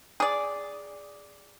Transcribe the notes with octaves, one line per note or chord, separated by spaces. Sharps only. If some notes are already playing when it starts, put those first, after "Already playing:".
G#4 D5